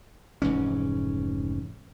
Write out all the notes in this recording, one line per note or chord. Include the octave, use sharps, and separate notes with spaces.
F1 G#2 E3 C#4